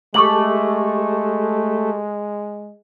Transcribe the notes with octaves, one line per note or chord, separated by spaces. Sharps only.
G#3 A3 G4 A4 C#6 D6 F#7